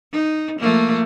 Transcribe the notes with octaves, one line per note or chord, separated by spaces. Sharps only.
D#4
F3 A3 A#3